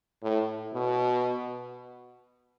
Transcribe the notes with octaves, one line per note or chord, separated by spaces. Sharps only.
A2
B2